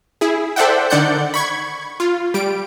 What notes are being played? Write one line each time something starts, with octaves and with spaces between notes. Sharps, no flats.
E4 G#4
A4 C5 D5 E5 F#5 G5
D3 D#3 D5 F#5 G6 C#7
B5 C#6 G#6
F4
G3 D7